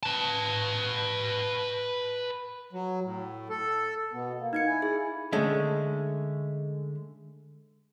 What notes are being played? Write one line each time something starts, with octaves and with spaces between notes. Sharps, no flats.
B4 A5
F#3
A2
A4
B2 B3
A#3
D#4 G#6 C#7
E4 G#5
G#4
D3 G#3 A3 C#4